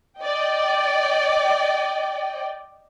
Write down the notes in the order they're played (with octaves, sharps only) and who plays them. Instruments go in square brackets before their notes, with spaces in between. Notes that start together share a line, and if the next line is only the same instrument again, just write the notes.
[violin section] D5 D#5 G5